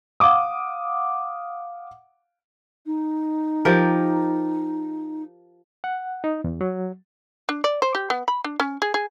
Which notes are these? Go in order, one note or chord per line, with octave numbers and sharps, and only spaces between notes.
F5 F#5 D6 D#6
D#4
F3 G4 A#4
F#5
D#4
E2
F#3
D4
D5
C5
G4
B3
B5
D4
C#4
G#4
G#4